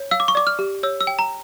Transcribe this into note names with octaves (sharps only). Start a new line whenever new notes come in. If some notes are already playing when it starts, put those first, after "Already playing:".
Already playing: C#5
F5 E6
D6
C#6
D5 D6
F6
G4
C#5 E6
E6
G5
A#5